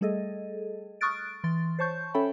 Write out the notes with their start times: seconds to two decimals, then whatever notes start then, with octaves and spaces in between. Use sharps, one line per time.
0.01 G3 A3 G#4 A4 D#5
1.01 C#6 D#6 F6 F#6 A6 D7
1.44 E3 C6 A6
1.79 C5 C#5 A5 C#6 G6
2.14 C#4 A4 C#5 E5 G5 B5